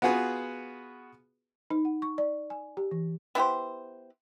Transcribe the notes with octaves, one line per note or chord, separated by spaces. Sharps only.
B3 F4 F#4 G#4 B4
D#4
F#5
C#6
D5
G#5
G4
E3
B3 E4 G4 C5